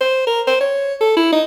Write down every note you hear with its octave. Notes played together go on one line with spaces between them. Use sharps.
C5
A#4
C5
C#5
A4
E4
D#4